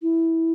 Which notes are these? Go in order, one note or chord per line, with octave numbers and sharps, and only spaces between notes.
E4